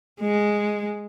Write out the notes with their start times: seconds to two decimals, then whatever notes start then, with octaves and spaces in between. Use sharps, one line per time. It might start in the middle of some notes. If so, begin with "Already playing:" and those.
0.21 G#3